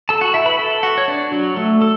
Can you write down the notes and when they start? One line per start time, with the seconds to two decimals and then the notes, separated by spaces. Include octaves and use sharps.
0.09 A4 A5
0.21 F#4 F#5
0.34 E4 E5
0.46 B4 B5
0.59 A4 A5
0.83 F#4 F#5
0.98 C#5
1.08 D4 D5
1.32 F#3 F#4
1.56 A3 A4
1.82 A4